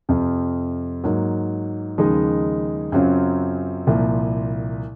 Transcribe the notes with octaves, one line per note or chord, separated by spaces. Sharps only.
F2 C3 F3
G#2 F#3 A#3
D#2 C#3 F3 G#3 D#4
F#2 C#3 F#3 C4 F4
C2 A#2 F3 A#3